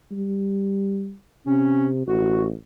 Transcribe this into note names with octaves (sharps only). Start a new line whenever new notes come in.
G3
C3 C#4
A1 F#4